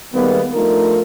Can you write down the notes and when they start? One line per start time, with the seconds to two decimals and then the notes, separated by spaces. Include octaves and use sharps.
0.14 D#3 G3 G#3 A#3 B3
0.55 F3 A3 D4 D#4 F4 A#4